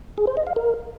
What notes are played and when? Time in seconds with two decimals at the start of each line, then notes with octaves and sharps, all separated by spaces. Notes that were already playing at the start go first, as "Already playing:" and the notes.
0.18 G#4
0.27 C5
0.37 D#5
0.47 F5
0.56 A#4